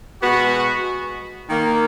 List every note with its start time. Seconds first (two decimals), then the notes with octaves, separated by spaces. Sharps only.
0.21 B2 G#3 B3 F#4
1.48 D#3 A#3